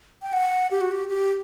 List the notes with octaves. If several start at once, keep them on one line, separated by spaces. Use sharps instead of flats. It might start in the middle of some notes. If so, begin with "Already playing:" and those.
G5
F#5
G4
F#4
G4
G4